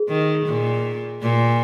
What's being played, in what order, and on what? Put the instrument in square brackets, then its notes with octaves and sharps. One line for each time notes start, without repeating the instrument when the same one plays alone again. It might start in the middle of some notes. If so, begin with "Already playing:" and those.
Already playing: [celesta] G#4
[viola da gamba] D#3
A#2
A#2